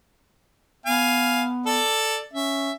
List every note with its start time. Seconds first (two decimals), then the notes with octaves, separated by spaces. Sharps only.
0.86 B3 F5 G#5
1.66 A4 D5
2.33 C#4 E5